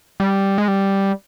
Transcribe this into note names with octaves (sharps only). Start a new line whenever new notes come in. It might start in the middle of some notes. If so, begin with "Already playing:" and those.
G3
G#3
G3